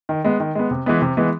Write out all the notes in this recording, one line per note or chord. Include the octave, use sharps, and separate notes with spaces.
D#3
G#3 B3
D#3
G#3 B3
C3
E3 G#3 B3
C3
E3 G#3 B3